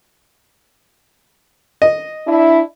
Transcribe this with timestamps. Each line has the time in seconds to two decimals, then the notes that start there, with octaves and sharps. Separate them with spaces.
1.82 D#5
2.27 D4 E4